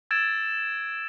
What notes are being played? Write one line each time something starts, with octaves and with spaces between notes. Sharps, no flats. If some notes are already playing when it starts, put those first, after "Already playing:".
E6 G#6 A6 D7 E7